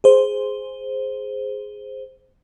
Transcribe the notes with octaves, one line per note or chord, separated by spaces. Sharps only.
G#4 C5